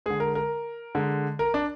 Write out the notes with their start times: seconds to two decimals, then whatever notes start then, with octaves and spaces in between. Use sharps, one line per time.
0.06 D3 G#3 G#4
0.20 A#4
0.35 A#4
0.95 D3 G#3
1.39 A#4
1.54 D4